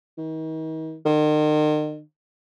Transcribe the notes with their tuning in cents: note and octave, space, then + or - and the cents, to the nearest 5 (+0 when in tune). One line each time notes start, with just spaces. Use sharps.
D#3 +40
D#3 -40